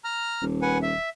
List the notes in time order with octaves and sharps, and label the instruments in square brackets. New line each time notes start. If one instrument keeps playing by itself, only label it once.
[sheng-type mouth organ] A#5 F6
[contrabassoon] D#1
[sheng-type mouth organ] B4 F#5 G#5
E5